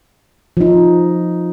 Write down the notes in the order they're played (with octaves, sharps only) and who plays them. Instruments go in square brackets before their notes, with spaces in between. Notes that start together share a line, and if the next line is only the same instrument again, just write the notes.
[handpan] F3 D#4